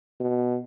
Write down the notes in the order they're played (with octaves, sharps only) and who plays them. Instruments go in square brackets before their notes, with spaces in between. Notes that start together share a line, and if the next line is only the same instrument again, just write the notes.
[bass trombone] B2